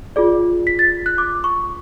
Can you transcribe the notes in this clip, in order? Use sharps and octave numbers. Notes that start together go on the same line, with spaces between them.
F4 G#4 D5
B6
A6
F#6
D6
C#6